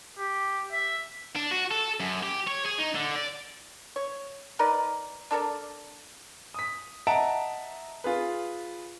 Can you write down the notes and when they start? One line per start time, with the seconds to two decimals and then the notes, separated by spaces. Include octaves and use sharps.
0.18 G4
0.72 E5
1.35 D4
1.51 F#4
1.71 A4
2.00 F#2
2.23 G4
2.48 C#5
2.66 G#4
2.79 D#4
2.95 D3
3.15 D5
3.96 C#5
4.59 D#4 A#4 B4 D5
5.31 D4 A4 A#4 D5
6.54 D#6 B6
7.07 D#5 E5 F#5 A5 A#5 D7
8.04 F4 G#4 B4